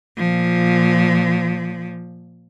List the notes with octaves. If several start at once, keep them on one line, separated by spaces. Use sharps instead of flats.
A#2 F3